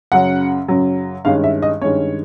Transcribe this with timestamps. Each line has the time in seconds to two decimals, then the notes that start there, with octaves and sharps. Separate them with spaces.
0.12 F#2 C#3 F#3 F#5
0.68 F#2 C#3 F#3
1.25 G2 D#3 G#3 C#4 F5
1.44 E5
1.62 D#5
1.81 G2 D#3 G#3 C#4 C#5